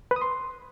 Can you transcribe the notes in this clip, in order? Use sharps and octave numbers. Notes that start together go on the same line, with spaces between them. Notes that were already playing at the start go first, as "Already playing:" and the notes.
B4
D#6
C6